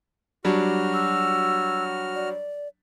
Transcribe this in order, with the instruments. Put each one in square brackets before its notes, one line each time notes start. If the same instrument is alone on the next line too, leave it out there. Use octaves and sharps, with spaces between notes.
[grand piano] F#3 G3 D4 [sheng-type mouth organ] F#4 F6
[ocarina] E6
D5